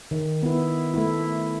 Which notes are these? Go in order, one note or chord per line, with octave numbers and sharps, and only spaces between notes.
D#3
B3 E4
A3 B3 E4